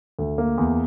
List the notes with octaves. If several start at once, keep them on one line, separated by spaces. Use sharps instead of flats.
D2
A#3
E2